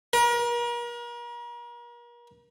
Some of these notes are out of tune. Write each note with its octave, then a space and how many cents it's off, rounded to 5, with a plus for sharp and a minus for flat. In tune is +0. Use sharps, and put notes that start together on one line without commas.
A#4 +40